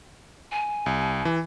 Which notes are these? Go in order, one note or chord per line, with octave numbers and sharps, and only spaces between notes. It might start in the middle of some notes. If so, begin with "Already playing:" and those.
G#5
C2
E3